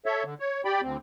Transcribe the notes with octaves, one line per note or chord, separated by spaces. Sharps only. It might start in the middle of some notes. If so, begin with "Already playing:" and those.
A4 C#5 E5
D3
C#5
G4 D5 G5 B5
D2 C4